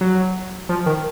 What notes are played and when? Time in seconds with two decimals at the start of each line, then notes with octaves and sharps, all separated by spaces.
0.01 F#3
0.69 F3
0.86 D#3